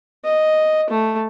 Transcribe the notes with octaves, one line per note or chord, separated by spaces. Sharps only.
D#5
A3